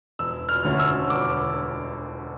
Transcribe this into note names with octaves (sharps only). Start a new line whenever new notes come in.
E1 E6
F6
D2 D3 A3 C#4
E6
E1 D6